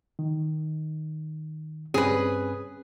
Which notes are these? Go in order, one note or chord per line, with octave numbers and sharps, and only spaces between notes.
D#3
G2 C4 C#4 G#4 B4